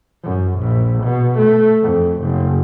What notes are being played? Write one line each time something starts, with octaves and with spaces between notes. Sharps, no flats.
F#2
A#1
B2
A3
F2
F#1